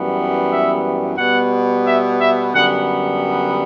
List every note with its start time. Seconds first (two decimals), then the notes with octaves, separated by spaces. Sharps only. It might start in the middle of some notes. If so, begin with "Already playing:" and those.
Already playing: F#2 E3 G3 B3
0.49 E5
1.17 B2 G3 B3 F#5
1.85 E5
2.19 E5
2.54 F#2 D3 G3 B3 F#5